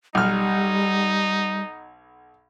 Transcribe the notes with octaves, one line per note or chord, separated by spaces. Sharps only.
B1 G3 D#4 F6